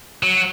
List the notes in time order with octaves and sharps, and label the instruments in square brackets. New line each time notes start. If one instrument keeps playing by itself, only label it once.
[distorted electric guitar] F#3